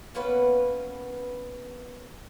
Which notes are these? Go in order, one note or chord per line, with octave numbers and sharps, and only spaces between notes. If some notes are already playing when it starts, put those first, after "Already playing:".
A#3 B3 C#4 B4